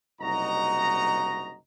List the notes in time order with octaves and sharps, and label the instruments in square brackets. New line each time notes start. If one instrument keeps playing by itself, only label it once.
[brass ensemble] F#1 C2 D#4 F#4 D#5 A#5